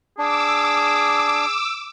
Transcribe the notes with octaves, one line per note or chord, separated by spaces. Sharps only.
D4 G#4 D6 E6